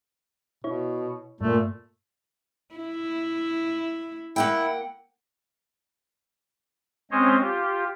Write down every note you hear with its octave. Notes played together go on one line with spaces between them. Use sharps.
B2 E4 C#5
G2 A#2 A3
E4
A#3 E4 F#5 G5
G#3 C4 C#4 C5 C#5 D#5
F4 G4